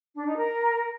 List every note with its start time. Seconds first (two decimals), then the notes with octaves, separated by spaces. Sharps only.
0.15 D4
0.26 D#4
0.36 A#4